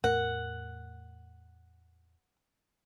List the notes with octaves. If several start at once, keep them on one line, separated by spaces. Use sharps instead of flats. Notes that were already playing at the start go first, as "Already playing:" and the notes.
E2 A2 A3 A#4 F#5